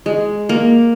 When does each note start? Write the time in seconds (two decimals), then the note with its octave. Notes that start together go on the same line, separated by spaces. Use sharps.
0.06 G#3
0.49 A#3